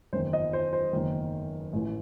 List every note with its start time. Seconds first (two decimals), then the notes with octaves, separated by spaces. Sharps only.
0.13 F#1 E2 D#3 C5
0.33 D#5
0.53 C5
0.73 C5
0.93 F#1 E2 D#3
1.73 A1 A2 E3